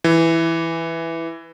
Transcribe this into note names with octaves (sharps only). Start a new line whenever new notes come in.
E3